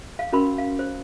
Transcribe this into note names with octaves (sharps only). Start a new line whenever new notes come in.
F5
C#4 F#4 A#4 B5 C6
F5
C5